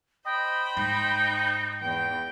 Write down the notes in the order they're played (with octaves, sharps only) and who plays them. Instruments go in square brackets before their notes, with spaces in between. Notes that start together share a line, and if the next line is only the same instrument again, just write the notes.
[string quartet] C5 B5 [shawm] D#5 [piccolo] G5
[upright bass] G#2 [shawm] D#4
[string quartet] E2 [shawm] G5